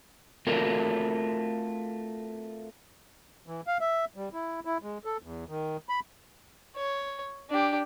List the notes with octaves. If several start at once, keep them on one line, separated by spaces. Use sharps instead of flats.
A3 C4 F4 F#4 A#4
E3
F5
E5
G3
E4
E4
G#3
A4
E2
D#3
B5
C#5
D4 G4